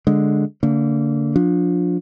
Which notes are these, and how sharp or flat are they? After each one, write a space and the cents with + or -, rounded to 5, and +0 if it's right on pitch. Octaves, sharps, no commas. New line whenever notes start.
D3 +0 G#3 +0
D3 -30 A#3 -35
F3 +25 D4 +0